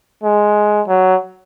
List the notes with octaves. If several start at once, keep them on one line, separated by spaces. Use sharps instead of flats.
G#3
F#3